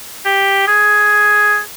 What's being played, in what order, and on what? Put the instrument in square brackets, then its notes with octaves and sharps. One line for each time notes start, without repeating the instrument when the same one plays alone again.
[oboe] G4
G#4